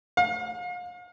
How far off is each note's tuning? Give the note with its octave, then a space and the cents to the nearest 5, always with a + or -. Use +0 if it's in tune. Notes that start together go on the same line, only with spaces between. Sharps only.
F5 +40